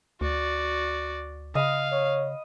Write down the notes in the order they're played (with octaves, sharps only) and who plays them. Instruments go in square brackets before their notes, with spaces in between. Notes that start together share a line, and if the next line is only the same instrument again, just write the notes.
[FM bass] D2 [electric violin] F#4 D5
[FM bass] C#3 [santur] D#5 B5 [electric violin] F5
[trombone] C#5